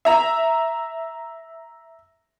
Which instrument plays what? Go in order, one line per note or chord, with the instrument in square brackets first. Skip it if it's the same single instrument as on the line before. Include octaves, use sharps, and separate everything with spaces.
[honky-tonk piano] E5 A#5